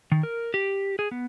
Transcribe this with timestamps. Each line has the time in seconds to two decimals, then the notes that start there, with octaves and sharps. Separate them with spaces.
0.12 D#3
0.23 A#4
0.54 G4
0.99 G#4
1.11 B3